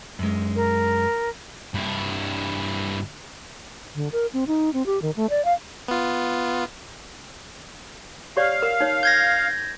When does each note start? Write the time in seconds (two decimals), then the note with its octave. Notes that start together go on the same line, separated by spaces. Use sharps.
0.19 F#2 G#3
0.56 A#4
1.74 G2 E4
3.95 D3
4.12 A#4
4.33 C4
4.47 D#4
4.73 C4
4.86 G4
5.02 D#3
5.16 A3
5.30 D5
5.45 F5
5.88 B3 F4
8.37 G4 C#5 D5 F5
8.62 A#4
8.80 D#4 C#5
9.03 G6 G#6 A#6